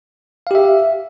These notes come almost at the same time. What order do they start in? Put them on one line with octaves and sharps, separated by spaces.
F5 G4 E5